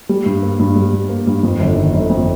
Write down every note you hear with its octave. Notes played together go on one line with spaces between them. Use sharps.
G3
G2
A#3
G2
G3
G2
A#3
G2
F2
G1
D#3
G1
F2